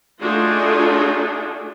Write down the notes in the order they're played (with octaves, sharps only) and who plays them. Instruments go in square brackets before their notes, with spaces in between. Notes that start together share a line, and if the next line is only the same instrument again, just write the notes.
[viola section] A3 D4 D#4 F4 F#4 G#4